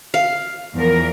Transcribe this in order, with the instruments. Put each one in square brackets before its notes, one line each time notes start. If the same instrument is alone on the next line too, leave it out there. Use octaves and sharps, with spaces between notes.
[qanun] F5
[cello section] E2 F3 A#4